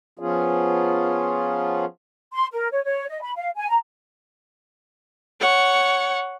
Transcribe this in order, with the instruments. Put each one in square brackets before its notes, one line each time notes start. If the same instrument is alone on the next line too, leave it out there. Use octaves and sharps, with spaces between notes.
[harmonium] F3 B3 C#4 F4 G#4
[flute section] C6
A#4
C#5
C#5
D#5
B5
F5
G#5
A#5
[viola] C#5 F#5